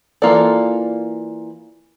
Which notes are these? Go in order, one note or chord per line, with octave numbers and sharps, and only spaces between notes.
E3 A#3 F4 A4 D5